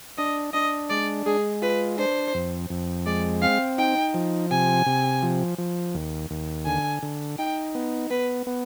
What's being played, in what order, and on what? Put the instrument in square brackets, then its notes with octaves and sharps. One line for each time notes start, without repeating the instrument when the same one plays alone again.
[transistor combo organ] D4 [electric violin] D#5
[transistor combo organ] D4 [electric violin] D#5
[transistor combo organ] G#3 [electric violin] D5
[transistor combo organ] G#3 [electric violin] G#4
[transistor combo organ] F4 [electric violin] B4
[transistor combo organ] D4 [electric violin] C5
[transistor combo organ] F2
F2
[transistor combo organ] G#3 [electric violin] D5
[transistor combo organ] C4 [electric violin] F5
[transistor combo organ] D#4 [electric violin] G5
[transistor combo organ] F3
[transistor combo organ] C3 [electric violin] G#5
[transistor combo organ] C3
F3
F3
D#2
D#2
[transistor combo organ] D3 [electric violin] G#5
[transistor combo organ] D3
[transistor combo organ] D#4 [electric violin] G5
[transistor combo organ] B3
[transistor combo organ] B3 [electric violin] B4
[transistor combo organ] B3